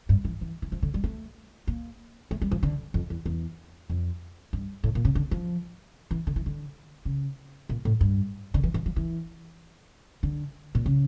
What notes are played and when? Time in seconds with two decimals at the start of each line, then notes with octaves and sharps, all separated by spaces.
0.09 G2
0.25 E3
0.41 E3
0.62 E3
0.72 F3
0.83 D3
0.94 G3
1.04 A3
1.67 A#3
2.31 A3
2.42 G3
2.51 F3
2.63 D3
2.94 F2
3.10 E2
3.26 E2
3.90 F2
4.53 G2
4.84 A2
4.95 A#2
5.05 C#3
5.15 D3
5.31 F3
6.11 E3
6.27 D3
6.36 E3
6.46 D3
7.05 C#3
7.69 A#2
7.85 A2
8.01 G2
8.54 D3
8.63 E3
8.74 E3
8.86 F3
8.96 E3
10.23 D3
10.75 A#2
10.86 C#3